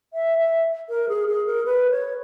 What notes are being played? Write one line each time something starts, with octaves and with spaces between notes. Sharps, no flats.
E5
E5
A#4
G#4
G#4
A#4
B4
C#5